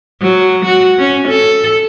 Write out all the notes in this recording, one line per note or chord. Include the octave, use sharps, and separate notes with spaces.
F#3
F#4
C#4
A4